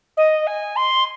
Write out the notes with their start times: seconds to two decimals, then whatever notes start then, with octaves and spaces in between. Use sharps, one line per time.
0.16 D#5
0.46 G#5
0.76 C6